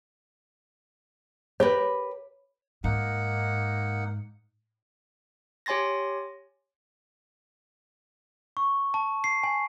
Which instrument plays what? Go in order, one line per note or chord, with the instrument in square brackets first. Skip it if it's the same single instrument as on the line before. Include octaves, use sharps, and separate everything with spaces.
[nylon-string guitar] G4 A#4 B4 [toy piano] C#5
[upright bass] G#2 [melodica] A#3 D#4 F#5
[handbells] G4 C#5 G#5 C6 A6 A#6
[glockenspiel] C#6
A5
C7
G#5